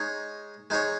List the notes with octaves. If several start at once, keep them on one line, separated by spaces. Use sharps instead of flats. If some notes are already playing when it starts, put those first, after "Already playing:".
Already playing: G#3 D#4 G#4 C#5
G#3 D#4 G#4 C#5